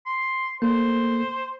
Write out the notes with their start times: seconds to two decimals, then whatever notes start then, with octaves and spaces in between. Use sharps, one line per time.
0.06 C6
0.62 A#3 A4 C5